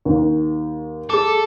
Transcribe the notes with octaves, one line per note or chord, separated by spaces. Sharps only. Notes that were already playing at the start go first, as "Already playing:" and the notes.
D#2
G#4 A4 D6